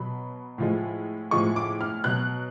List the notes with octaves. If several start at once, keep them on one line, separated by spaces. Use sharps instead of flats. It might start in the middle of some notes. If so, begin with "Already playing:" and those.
Already playing: B2 F#3 B5
A2 F3 G#3
A2 F3 G#3 C#6
D6
F6
B2 F#3 F#6